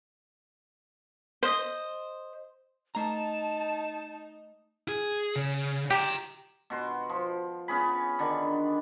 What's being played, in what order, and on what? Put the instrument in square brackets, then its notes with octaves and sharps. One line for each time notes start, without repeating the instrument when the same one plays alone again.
[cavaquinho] C5 D#5
[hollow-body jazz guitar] A3 A#5 [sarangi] D#4 [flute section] A5
[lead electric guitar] G#4
C#3
[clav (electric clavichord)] G4 [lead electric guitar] G5 A#5
[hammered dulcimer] B2 F#4 C6
F3
B3 C#4 G#4 B5
D3 D#3 D4